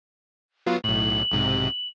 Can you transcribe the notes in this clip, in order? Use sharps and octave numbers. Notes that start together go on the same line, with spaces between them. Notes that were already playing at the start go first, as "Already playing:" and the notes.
F#3 B3 F4
B1 A2 F#7
B1 G#2 C3